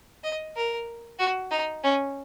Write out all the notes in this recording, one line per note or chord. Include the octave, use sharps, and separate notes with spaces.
D#5
A#4
F#4
D#4
C#4